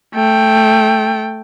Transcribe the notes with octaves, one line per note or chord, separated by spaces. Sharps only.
A3 G5